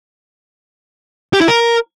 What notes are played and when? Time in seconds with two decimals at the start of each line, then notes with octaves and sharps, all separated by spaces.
1.33 G4
1.41 E4
1.48 A#4